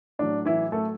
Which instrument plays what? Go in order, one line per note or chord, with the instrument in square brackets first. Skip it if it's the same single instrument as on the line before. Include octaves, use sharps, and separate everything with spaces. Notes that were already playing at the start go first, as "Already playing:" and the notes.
[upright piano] A2 F#3 D4
E3 E4
A3 A4